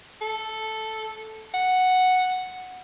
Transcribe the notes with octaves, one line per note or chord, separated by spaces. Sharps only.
A4
F#5